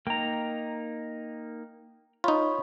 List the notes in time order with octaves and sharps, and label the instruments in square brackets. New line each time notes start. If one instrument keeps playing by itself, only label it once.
[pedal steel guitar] A#3 D#4 [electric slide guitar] G5 A#5
[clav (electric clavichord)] D#4 F4 [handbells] C#5 B5 C#6